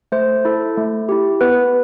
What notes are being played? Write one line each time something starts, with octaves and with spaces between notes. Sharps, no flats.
A3 C5
E4 A4
A3
E4 G4
B3 B4